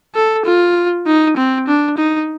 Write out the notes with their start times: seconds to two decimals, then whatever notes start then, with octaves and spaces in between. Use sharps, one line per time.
0.15 A4
0.45 F4
1.06 D#4
1.37 C4
1.67 D4
1.97 D#4